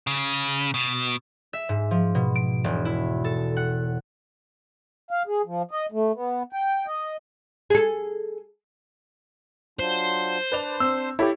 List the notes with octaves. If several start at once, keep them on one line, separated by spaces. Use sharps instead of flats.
C#3
B2
E5
G#2
F3
B2
D7
E1
E4
A4
F#5
F5
G#4
F3
D#5
A3
B3
G5
D#5
G#4 A4
F#3 D4 F4 C5
D4 B4 D5 F7
C4 E6
E4 G4 A4 C#5 E5